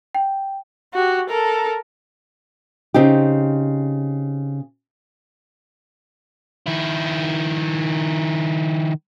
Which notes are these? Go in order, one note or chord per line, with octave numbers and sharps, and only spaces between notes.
G5
F#4 G4
A4 A#4
C#3 C4 D#4 G4
D#3 E4